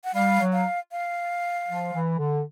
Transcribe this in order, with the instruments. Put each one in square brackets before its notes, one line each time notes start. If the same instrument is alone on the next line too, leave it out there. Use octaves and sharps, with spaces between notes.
[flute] F#5
[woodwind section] G3 [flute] F5
[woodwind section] F#3
[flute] F5
F5
[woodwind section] F3
E3
D3